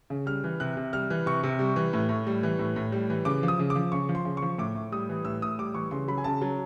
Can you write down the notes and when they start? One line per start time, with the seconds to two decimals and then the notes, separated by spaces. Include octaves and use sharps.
0.10 C#3
0.26 G3 F6
0.44 E3
0.60 C3 F#6
0.77 C3
0.93 G3 F6
1.10 E3
1.26 C3 C#6
1.43 C3
1.59 G3
1.76 E3
1.93 A2
2.09 A2
2.27 G3
2.43 E3
2.59 A2
2.76 A2
2.92 G3
3.10 E3
3.25 C#3 D6
3.43 F3
3.48 D#6
3.59 C#3
3.70 D6
3.75 F3
3.92 C#3 C#6
4.09 F3
4.15 C6
4.25 C#3
4.37 C#6
4.42 F3
4.58 A2 D6
4.75 A2
4.92 G3 D#6
5.09 E3
5.25 A2 E6
5.42 A2 D#6
5.58 G3 D6
5.74 E3 C#6
5.91 C#3 C6
6.08 F#3 B5
6.18 G#5
6.24 C#3 A5
6.41 F#3 A5